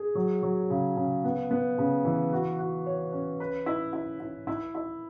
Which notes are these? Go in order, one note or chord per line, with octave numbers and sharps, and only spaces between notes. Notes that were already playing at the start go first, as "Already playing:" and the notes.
Already playing: G#4
F#3
F#3
C#3
C#3
B3
B3
C#3
E3
F#4
F#4
C#5
C#4
B4
E4
E4
E4
E4
E4